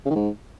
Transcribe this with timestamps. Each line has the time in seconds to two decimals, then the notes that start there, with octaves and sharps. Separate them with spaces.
0.05 C#3
0.10 D#3
0.15 G#2